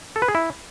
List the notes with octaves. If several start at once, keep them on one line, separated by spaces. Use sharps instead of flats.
A4
B4
G#4
E4